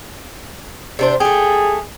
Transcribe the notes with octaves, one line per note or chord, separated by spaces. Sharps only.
C3 D4 C5
A3 G4 G#4